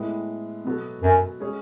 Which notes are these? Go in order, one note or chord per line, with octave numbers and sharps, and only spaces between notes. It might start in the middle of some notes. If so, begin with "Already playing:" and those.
Already playing: A2 G#3 B3 E4 B4
B2 F#3 B3 F#4 A4
F#2
G#3 C#4 G#4 C#5